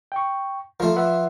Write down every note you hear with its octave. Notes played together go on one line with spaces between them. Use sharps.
G5 C#6
F3 A3 F4 A#4
B4 E5 F#5